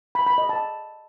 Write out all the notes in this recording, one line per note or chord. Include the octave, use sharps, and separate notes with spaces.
B5
B5
D#5
A5